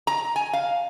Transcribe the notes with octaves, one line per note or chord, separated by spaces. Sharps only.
A#5
G#5
F5